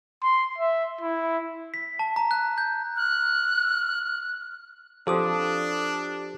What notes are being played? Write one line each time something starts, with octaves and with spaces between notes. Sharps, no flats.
C6
E5
E4
B6
A5
A#5
F#6
G6
F6 F#6
F3 C4 D4 G4 A4 D6 D#6